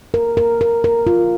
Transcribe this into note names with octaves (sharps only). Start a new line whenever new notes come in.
A#4
A#4
A#4
A#4
F4